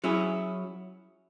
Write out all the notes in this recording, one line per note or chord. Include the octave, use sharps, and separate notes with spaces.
F#3 C#4 E4 G#4